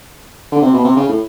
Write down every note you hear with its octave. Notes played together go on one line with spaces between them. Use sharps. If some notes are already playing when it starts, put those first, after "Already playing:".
D3
C3
B2
C3
C#3
A2